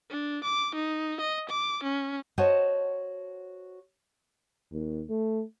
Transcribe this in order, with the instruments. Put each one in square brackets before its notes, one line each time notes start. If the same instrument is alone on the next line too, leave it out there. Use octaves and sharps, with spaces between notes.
[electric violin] D4
D6
D#4
D#5
D6
C#4
[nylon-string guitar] F#4 C5 C#5 D#5 F#5 A5
[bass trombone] D#2
A3